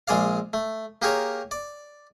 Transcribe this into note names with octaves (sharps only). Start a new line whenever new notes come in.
A#1 G#3 G#4 D5 F5
A3
A#3 G4 G#4 A#4 C#5
D5